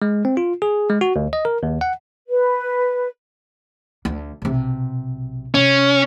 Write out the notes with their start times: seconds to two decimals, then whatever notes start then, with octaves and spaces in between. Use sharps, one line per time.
0.02 G#3
0.25 C4
0.37 F4
0.62 G#4
0.89 G#3
1.01 F#4
1.16 D2
1.33 D#5
1.45 A#4
1.63 D#2
1.81 F#5
2.29 B4
4.05 D2
4.42 B1 C3
5.54 C3 C#4